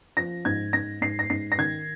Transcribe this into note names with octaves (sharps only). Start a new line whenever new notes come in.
F3 A#6
G#2 G#6
G#2 A#6
G#2 C7
A#6
G#2 C7
A#6
D#3 G#6